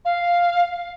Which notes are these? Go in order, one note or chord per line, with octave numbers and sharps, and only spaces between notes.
F5